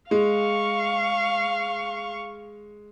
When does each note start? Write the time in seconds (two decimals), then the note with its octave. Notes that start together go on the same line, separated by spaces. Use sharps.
0.11 G#3 F5 C#6